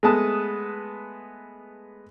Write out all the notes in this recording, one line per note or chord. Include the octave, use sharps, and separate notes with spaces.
G#3 A3 B3 A5 D#6